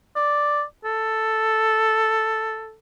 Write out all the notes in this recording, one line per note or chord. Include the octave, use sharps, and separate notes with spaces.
D5
A4